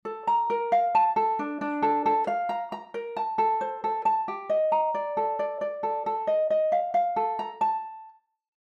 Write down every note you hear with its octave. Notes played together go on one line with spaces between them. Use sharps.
A4
A#5
A#4
F5
A5
A4
D4
D4
A4
A4
F5
A#5
A#5
A#4
A5
A4
C5
A4
A5
G4
D#5
A#5
D5
A4
D5
D5
A4
A4
D#5
D#5
F5
F5
A4
A#5
A5